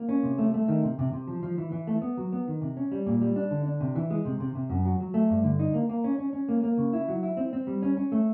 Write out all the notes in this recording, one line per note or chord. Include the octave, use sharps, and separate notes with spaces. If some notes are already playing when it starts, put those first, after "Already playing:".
Already playing: A#3
C#4
C3
A3
A3
D#3
C3
C3
C3
F3
F3
E3
E3
A3
B3
F#3
B3
D#3
C3
C#4
G3
A#2
G3
D4
D3
D4
C3
E3
G#3
C3
C3
C3
F#2
F#3
F#3
A3
G2
D3
D#4
A#3
A#3
C#4
C#4
C#4
A#3
A#3
C#3
E4
F#3
E4
C4
C4
G3
C#4
C#4
A3